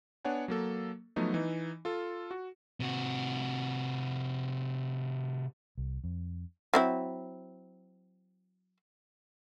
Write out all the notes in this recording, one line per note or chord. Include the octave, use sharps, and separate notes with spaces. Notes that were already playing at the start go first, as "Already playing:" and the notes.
B3 D4 C#5 F#5 G#5
F#3 A#3 A4
F3 F#3 A3 B3 D#4
E3 D#4
F4 A4
F#4
C3 F#4
C2
F2
F#3 C4 E4